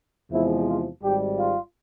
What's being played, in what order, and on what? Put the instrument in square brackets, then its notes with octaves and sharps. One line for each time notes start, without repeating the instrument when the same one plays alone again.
[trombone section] E2 C3 F3 G#3 E4
F4
G#1 G#2 G3 G4
F4